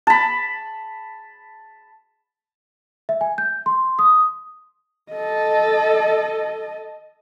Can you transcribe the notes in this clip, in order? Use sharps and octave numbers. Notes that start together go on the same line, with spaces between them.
A5 B5
E5
G#5
G6
C6
D#6
A4 D#5